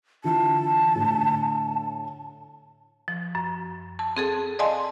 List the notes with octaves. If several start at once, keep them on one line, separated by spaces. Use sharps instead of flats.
D3 E3 F4 A5
A2 D3
F3
F#2
A5
C4 G#4 A4
D5 D#5 F5 G#5 A5 C6